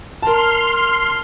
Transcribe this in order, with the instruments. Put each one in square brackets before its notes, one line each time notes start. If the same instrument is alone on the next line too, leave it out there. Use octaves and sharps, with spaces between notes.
[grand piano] A#4 A5 [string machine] C6 F6